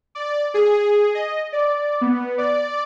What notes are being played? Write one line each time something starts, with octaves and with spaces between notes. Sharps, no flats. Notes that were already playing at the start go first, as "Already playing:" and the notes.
D5
G#4
D#5
D5
B3
D5